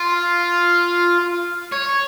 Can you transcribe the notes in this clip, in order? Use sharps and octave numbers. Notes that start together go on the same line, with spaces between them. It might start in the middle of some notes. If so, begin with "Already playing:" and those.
Already playing: F4
C#5